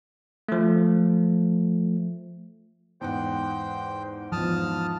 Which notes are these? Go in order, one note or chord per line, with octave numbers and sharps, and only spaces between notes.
F3 A3
E2 G#2 C5 F#5 G5
E2 G#2 F3 A5 D#6 F6